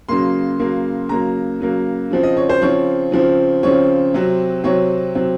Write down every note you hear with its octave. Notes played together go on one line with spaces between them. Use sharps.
C#3 F#3 A#3 C6
C#3 F#3 A#3
C#3 F#3 A#3 A#5
C#3 F#3 A#3
C#3 F3 C4
D#5
C#5
C5
C#3 F3 C4 C#5
C#3 F3 C4
C#3 F3 C4 C#5
C3 F#3 C4
C3 F#3 C4 C#5
C3 F#3 C4